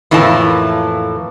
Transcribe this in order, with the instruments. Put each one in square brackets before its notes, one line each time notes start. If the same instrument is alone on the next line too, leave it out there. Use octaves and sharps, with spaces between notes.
[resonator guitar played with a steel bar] F2 A2 E3 A#3 A5